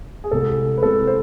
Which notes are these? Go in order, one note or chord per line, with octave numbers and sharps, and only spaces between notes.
G#4
C2 C3 G#3 A4
B4
C2 C3 G#3 A4
C5